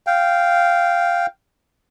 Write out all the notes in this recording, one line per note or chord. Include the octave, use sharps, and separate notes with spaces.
F5 G5